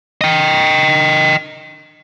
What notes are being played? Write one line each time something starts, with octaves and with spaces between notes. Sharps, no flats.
D#5 G5